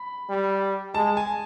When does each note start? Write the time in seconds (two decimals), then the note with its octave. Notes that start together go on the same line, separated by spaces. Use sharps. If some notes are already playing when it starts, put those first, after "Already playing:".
Already playing: B5
0.29 G3
0.94 G#3 A5
1.17 G#5